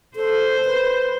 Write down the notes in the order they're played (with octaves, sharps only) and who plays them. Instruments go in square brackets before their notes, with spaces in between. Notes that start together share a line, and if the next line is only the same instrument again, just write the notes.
[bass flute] A4 [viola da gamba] C5
[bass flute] B4